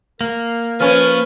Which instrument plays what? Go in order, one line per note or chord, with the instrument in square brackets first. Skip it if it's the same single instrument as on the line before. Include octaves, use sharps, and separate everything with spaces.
[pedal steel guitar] A#3 [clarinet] A#4
[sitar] F3 C#4 [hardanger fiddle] B4 [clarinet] F6